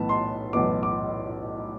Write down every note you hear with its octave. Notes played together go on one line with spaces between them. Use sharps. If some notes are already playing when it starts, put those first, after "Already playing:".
Already playing: B1 A2 E3 B3 A5
C6
B1 A2 E3 B3 D6
D6